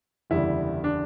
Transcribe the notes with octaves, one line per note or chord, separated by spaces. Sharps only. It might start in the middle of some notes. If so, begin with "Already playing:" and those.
F#1 E2 D3 G3 E4
D4